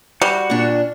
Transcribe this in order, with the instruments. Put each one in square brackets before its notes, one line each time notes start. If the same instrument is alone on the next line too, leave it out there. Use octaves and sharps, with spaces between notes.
[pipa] G3 [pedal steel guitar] F#4
[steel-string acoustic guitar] A#2 D4